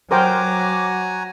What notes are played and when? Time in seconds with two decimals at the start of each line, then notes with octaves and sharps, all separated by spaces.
0.11 F#3 F#4 A#4 C5 G5 G#5 A#5 D6